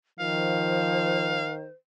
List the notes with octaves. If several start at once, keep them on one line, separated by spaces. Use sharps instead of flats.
D#3 F3 C5 F5